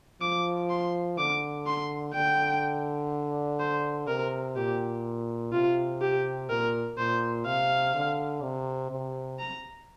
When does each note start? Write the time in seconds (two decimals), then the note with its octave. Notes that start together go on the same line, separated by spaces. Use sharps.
0.22 F3 D6
0.70 C6
1.18 D3 D6
1.66 C6
2.14 D3 G5
3.60 C5
4.08 C3 A#4
4.56 A#2 G4
5.53 C3 F4
6.01 G4
6.50 A#2 A#4
6.98 A#2 C5
7.46 C3 F5
7.95 D3
8.43 C3
8.92 C3
9.40 A#5